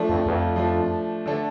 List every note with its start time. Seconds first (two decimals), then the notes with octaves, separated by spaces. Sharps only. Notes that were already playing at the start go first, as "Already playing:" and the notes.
Already playing: F3 A3 D4
0.10 F2
0.26 E2
0.32 F2
0.56 F3 A3 D4
1.26 D3 A3 D4 A4